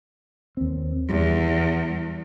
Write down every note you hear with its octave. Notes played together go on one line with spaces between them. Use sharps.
D#2 C4
E2 G3